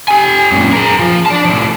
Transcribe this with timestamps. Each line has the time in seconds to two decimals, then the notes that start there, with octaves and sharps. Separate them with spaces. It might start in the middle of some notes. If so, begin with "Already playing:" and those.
0.08 G4 G#5
0.51 F#2 A#2
0.72 G#4 A#4
0.99 F3
1.26 D5 A5
1.45 A2 F3